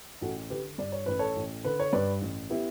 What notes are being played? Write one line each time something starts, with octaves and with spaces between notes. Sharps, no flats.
A1 F#4 A4
D3 G4 B4
G2 D5
C#5
A1 B4
A4 C#5
A1
D3 B4
C#5
G2 B4 D5
A1
B3 E4 G4